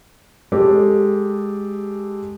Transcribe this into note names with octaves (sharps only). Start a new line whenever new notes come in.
G#3 G4 A4